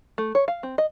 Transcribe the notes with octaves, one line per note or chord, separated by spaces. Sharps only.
A3
C#5
F5
C4
D#5